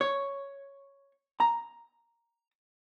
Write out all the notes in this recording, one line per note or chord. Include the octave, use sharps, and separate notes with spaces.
C#5
A#5